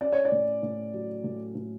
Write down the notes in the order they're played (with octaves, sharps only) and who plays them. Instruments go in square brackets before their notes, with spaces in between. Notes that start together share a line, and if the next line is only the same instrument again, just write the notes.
[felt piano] C#4 [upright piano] D5
[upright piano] C#5
D5
[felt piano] A2
A2
F#3
A2
A2